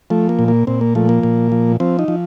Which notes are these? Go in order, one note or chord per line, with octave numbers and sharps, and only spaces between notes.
F3 A3
A#3
A#2
A#3
A#2 C4
A#3
F3 A3
A#3
A#2
F3
F3 C4
D#4
F3